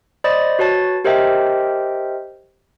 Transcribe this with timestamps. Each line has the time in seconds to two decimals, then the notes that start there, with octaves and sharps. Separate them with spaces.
0.24 C5 D5 D#5 B5 D#6 A6
0.59 F#4 B4 C#5 A5 A6
1.05 G4 A#4 C5 D#5 E5 G5